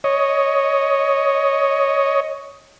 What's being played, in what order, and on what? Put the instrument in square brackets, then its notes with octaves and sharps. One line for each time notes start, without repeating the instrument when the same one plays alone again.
[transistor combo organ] C#5 D#5